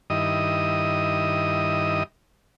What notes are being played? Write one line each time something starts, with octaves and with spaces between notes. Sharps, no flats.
G2 D#3 E4 D#5 D#6